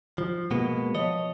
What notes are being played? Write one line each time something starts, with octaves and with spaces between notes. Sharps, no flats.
F3
B2 G#3 A#3 B3
F3 C#5 D#5